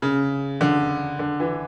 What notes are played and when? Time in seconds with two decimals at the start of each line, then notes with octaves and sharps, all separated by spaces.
0.02 C#3
0.61 D3
1.19 D3
1.40 E3